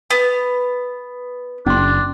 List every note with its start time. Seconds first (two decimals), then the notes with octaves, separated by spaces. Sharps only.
0.10 B3
1.66 F#1 C#4 D4 C6